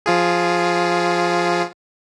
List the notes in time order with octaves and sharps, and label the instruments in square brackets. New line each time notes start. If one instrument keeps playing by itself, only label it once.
[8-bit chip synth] F3 F4 G#4